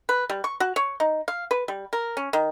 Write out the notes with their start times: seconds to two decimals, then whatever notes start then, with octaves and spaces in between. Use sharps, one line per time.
0.09 B4
0.30 G3
0.44 C#6
0.60 F#4
0.76 C#5
1.00 D#4
1.28 F5
1.51 B4
1.68 G3
1.93 A#4
2.17 C#4
2.33 D#3